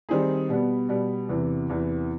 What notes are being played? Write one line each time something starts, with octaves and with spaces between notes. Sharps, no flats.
D#3 G3 C4 D#4 G#4
B2 G3 B3
B2 G3 B3
E2 C3 E3
E2 C3 E3